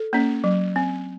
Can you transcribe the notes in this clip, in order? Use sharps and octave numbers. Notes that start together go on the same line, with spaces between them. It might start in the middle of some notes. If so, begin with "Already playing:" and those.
Already playing: A4
A#3 C#4
F#3
C4